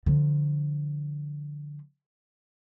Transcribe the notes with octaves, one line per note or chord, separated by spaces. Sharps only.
D3 F3